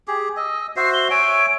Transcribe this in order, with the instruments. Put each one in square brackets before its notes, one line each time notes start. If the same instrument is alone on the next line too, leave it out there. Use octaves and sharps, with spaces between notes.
[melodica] G4 G#4
[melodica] D#5 [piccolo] E6
[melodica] F#4 C5 E5 [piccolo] C7
[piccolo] G7
[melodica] C#5 E5 G#5 [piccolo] D7